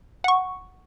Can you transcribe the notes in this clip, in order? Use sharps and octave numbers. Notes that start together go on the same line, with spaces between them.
F#5 C#6